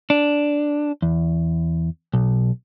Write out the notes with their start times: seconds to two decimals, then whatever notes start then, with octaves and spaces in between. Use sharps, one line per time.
0.10 D4
1.02 E2
2.14 B1